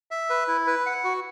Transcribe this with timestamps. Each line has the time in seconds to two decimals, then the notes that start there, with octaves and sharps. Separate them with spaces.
0.11 E5
0.30 B4
0.48 E4
0.67 B4
0.86 F#5
1.04 F#4